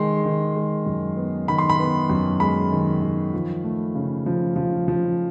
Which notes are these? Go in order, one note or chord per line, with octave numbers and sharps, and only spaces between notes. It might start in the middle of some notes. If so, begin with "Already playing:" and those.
Already playing: D#3 G#3 C6
D#3
G#3
F#2
B3
D#3 B5
C6
B5
B3
F#2
G#3 B5
D#3
D#3
F3
A3
C#3
F3
F3
F3